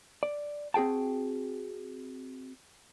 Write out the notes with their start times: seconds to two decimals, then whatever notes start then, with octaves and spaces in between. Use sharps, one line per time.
0.23 D5
0.74 C4 F#4 G#4 G5 A5